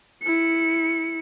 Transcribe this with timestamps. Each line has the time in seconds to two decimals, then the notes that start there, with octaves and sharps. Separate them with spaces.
0.22 E4 C#7